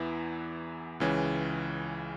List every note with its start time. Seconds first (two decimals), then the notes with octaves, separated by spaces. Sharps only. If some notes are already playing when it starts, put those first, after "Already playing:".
Already playing: E2 E3 B3 E4
1.00 C#2 C#3 E3 C#4